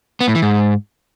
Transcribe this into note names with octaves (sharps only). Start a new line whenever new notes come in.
B3
A2
E3
G#2